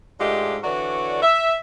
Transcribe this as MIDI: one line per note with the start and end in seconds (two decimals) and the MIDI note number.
0.20 0.58 44
0.20 0.58 56
0.20 0.58 57
0.20 0.58 62
0.20 0.58 65
0.20 0.58 67
0.64 1.21 50
0.64 1.21 52
0.64 1.21 62
0.64 1.21 66
0.64 1.21 73
0.64 1.21 74
1.22 1.57 76